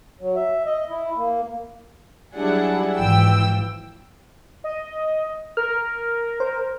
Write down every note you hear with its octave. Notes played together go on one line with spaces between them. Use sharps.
F#3
E5
D#5
E4
A#3
F#3 G3 D4 E4 G#4 F#5
G#1 E3 F3 G5 E6
D#5
A#4 F6
C5